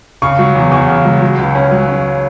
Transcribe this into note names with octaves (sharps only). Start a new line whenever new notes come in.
C#3 C#6
F#3
E2
E2 C#6
C#3
F#3
F#3
C#2
C#4
F#3
C#4